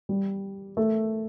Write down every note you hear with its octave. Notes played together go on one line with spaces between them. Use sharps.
G3
A3